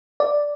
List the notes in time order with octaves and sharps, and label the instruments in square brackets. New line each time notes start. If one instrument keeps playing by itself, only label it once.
[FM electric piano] D5